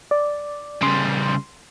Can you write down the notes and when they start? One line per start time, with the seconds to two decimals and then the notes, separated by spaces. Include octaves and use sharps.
0.11 D5
0.83 C#3 G3 C6